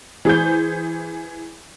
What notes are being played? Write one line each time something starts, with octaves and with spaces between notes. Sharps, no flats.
E3 G#4 C5 G6